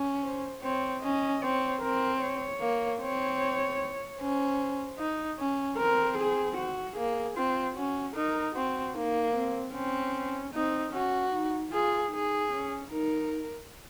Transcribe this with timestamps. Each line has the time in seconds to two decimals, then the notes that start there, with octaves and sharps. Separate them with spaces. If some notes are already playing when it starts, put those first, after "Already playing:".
Already playing: C#4
0.24 C5
0.63 C4 C#5
1.03 C#4 D#5
1.42 C4 C#5
1.82 C4 A#4
2.21 C#5
2.61 A#3
3.01 C4 C#5
4.20 C#4 C5
4.99 D#4
5.39 C#4
5.78 C4 A#4
6.18 G#4
6.57 F#4
6.97 A#3 G#4
7.36 C4 F4
7.77 C#4 F#4
8.16 D#4 A#4
8.56 C4 F#4
8.95 A#3 D#4
9.35 C4
9.74 C4 C#4
10.54 C4 D#4
10.93 C#4 F#4
11.33 D#4
11.73 F4 G#4
12.13 D#4 G#4
12.52 C#4
12.92 D#4 A#4